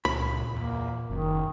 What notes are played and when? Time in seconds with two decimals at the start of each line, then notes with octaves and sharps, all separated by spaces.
0.05 C#2 A#2 B5
0.54 E2 A#3
1.10 F#1 F#2 D#3